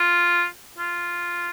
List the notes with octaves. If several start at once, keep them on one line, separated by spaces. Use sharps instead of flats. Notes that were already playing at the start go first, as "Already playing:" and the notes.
Already playing: F4
F4